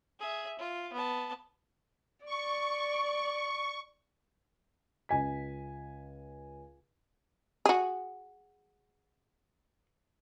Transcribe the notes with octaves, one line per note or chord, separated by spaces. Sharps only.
G#4 E5
F4
B3 A5
D5 C#6
C#2 G#5 B6
F#4 G#4